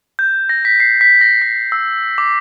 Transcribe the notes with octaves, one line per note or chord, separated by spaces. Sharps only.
G6
A#6
B6
C7
B6
A#6
B6
E6
D6